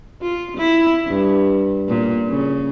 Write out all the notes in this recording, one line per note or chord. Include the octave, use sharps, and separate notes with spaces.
F4
E4
G2
A#2
C#3